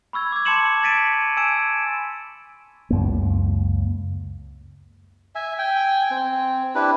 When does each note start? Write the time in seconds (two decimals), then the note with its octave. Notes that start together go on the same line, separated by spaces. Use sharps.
0.13 B5 C#6 E6 G#6
0.32 D6 G#6
0.45 A5 C6 D6 C#7 E7 F#7
0.83 G#6 A6 B6 D7 D#7
1.37 G#5 E6 G#6 D7 E7
2.90 C#2 F#2 A#3
5.35 E5 G#5
5.58 G5 G#5
6.11 C4
6.75 D4 E4 G4 B4